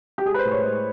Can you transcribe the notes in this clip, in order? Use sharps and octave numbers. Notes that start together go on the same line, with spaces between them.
G4
G#3 G#4
B4
C5
A2
C#5
G#3